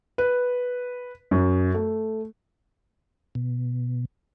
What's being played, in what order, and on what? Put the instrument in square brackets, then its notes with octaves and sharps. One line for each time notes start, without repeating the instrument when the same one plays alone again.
[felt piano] B4
F#2
A3
[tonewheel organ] B2